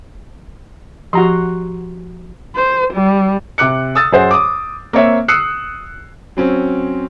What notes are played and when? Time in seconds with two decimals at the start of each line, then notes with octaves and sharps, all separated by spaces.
1.13 F3 F#4 G4 A#5 C6
2.56 C5
2.93 G3
3.58 C3 D6 F#6 C#7
3.95 D#6 E6 A6
4.12 F#2 G#4 C5 F#5
4.31 D6 D#6
4.93 A#3 C4 C#5 E5
5.28 D#6 E6 F#6 C7 C#7
6.37 F#3 C4 C#4